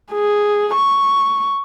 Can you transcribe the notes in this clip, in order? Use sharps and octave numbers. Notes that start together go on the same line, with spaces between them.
G#4
C#6